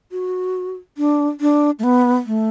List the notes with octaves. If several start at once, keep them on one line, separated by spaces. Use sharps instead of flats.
F#4
D4
D4
A3
B3
A3